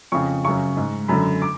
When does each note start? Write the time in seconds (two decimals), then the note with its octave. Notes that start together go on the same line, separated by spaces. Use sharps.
0.12 F2 C#3 C#6
0.45 F#2 C#3 C#6
0.77 G#2
1.08 F#2 D3 B5
1.42 D6